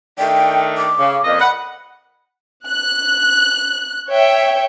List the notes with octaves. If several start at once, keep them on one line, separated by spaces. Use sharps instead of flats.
D#3 A3 D4 G5
D6
C#3
F2 A#2 D#5
F#5 B5
F#6
C#5 E5 G5